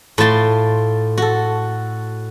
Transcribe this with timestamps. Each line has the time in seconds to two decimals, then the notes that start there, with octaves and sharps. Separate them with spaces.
0.18 A2 F4 A5 C6
1.18 F#4 A4